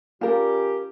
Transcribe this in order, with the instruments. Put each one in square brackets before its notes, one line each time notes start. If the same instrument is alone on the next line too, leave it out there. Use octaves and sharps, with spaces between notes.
[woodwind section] G3 C#4 G4 [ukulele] F4 A#4